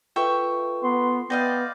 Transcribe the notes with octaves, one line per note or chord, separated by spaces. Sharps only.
F4 A4 B4 E5 G5 C#6
B3 C6
B3 D5 D#5 F5 G5 A#6